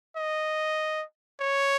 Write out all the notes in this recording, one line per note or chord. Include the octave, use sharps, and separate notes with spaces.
D#5
C#5